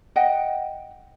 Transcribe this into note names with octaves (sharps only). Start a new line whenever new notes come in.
D#5 F#5 G5